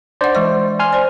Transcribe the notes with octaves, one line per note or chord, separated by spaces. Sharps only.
D4 C5 D5 F#5
E3 G#3 D#5
G#5 C6 F6
C5 D5